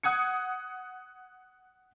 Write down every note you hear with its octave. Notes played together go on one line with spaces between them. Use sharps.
F#5 D#6 G#6 C#7